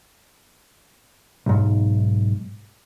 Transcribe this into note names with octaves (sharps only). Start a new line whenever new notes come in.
B1 G#2